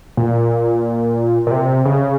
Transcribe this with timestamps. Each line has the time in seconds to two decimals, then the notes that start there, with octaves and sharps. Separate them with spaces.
0.17 A#2
1.47 A#2
1.51 C3
1.86 C#3